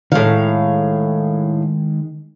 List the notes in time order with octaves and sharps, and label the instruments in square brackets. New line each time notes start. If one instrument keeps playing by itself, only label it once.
[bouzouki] A2 F5 [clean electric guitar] D#3 G#3 G#4